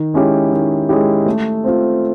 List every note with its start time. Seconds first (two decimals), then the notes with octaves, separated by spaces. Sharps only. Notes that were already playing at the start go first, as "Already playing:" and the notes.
Already playing: D#3
0.14 G#3 C#4 E4 G4
0.51 D#3
0.89 G#3 C#4 E4 G4
1.26 A3
1.64 C4 F4